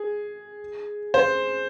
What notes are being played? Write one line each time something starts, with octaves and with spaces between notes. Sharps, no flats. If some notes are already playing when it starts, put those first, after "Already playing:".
Already playing: G#4
C5